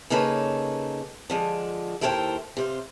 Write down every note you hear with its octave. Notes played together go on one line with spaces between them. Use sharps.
C#3 A#3 D#4 A4 B4 C#5
D3 F3 G#3
D#2 E4 A4 A#4 C5 G5
C3 C5 F5